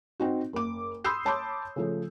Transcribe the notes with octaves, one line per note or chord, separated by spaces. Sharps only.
C4 D#4 F#4
F#1 D6
B5 C6 D#6 E6 G6 C7
C#5 A5 B5 C6 D6 G6
C#3 F3 A3